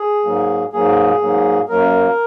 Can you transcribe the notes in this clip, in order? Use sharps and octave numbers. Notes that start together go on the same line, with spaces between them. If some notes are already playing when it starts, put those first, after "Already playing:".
Already playing: G#4
G#2 F#3 A#3
G#2 F#3 A#3 G#4
G#2 F#3 A#3
F#2 F#3 A#3 A#4